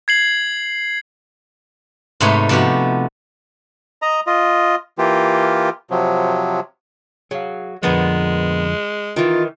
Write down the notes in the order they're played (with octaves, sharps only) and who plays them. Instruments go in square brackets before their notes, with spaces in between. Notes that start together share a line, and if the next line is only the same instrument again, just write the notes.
[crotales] G#6 C7 F#7
[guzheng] G#2 C3 A3 D#4 B4 C#5
C3 F3 B3 F#4 G4
[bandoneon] D#5 A#5
F4 D#5
E3 A#3 F4 G4
C3 F3 F#3
[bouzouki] F#3 [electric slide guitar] G#4 F5
[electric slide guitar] F2 D3 F3 [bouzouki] A#2 B3 B4 [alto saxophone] G#3
[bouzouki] D#3 E3 [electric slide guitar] D#4 [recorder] F4